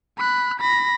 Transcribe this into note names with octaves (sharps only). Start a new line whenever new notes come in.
B5 F#6
B5 A#6